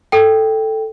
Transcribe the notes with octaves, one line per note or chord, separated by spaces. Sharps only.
A4 G5